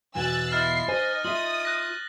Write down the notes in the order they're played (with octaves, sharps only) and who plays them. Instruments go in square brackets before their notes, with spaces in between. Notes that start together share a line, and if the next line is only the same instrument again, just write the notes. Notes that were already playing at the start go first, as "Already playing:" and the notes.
[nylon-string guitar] E2 B2 B3 [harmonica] G#5 [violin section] E6 F#6 A6
[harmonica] E4 F4 D#5 [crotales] F6 A6 [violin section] C7
[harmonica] D#4 [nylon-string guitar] C5 G#5 [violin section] D#5
[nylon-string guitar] F4 E5 [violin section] D#6 [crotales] F#7
[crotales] F#6 A#6